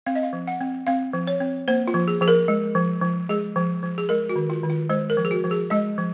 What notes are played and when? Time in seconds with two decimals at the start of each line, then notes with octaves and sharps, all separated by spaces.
0.06 C4 F5
0.15 D#5
0.23 F5
0.33 F3
0.47 F#5
0.61 C4
0.87 C4 F5
1.13 F3
1.27 C#5
1.40 C4
1.68 A#3 C5
1.88 F4
1.94 F3
2.08 G#4
2.21 F3 G#4
2.28 A#4
2.48 G#3
2.75 F3
3.01 F3
3.29 G#3 G#4
3.56 F3
3.83 F3
3.98 G#4
4.09 G#3 A#4
4.29 F#4
4.36 D#3
4.50 F4
4.64 D#3
4.70 F4
4.89 G#3 C5
5.10 A#4
5.17 F3
5.25 G#4
5.31 F#4
5.44 F3
5.51 G#4
5.70 G#3 D#5
5.98 F3